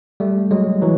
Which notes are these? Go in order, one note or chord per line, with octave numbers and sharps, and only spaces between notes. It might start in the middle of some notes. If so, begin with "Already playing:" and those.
G3 A3
F#3 G#3
E3 F#3